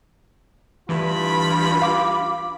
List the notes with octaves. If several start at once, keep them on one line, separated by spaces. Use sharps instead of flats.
D2 G2 E3 F4 B5
F5 D6